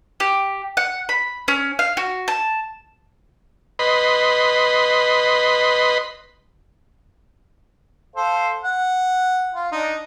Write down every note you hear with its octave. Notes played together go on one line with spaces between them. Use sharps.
G4
F#5
B5
C#4
F5
F#4
A5
B4 D#5 B5 C6
A4 C5 F5
F#5
F4
D4 D#4